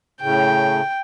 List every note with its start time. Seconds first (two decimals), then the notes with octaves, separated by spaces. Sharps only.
0.22 A2 C#3 G5